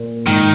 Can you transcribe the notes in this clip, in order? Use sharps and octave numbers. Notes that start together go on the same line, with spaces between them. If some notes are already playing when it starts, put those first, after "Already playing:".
Already playing: A#2
G#2 D#3